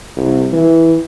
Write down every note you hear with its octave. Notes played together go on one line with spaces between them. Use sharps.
C2
E3